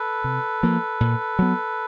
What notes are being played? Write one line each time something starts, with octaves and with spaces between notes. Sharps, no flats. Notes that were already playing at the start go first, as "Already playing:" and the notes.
Already playing: A4 B4
C3
F3 A#3
A#2
F#3 B3